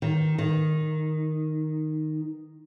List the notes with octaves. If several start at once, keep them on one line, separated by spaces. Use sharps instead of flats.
D#3
D#3